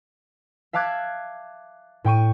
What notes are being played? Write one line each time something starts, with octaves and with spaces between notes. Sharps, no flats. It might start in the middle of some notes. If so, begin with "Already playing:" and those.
E5 F5 A5 D6 F#6 G#6
A2 G5 C#6 D#7